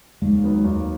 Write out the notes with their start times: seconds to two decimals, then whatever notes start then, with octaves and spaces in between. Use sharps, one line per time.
0.22 D#2 G#3
0.43 D#3 F#3 B3
0.64 D#2